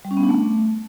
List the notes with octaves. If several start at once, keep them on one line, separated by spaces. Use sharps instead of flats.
G3
C#4
B3
D4
A3